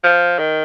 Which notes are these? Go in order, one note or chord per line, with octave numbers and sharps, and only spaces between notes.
F3
D#3